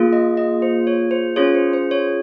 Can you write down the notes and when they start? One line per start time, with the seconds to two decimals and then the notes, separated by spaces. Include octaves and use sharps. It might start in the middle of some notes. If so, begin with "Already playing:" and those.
Already playing: A#3 F4 G#4
0.13 D#5
0.37 D#5
0.62 C5
0.87 C#5
1.11 C5
1.36 C#4 F4 G#4 C#5
1.55 C5
1.73 C5
1.91 C#5